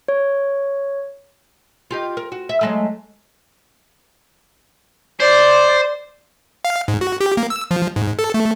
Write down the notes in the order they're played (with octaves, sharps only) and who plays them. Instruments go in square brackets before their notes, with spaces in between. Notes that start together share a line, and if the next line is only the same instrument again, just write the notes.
[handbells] C#5
[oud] F4 G4 D#5
A#4
F#4
E5
F#3 G#3 A3
[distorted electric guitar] C5 [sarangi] D5
[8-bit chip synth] F5
G#2
F#4
G4
A#3
E6
F3
G#2
A4
A3